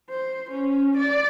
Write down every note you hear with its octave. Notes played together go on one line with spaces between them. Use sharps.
C5
C#4
D5